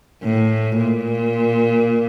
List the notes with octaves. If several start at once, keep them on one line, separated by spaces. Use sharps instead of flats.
A2
A#2